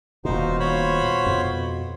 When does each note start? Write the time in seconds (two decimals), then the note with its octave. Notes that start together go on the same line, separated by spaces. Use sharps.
0.25 D#1 A#2 B3 D#4 F4 F#4 C5
0.60 C5 C#5 B5
1.26 F2 B2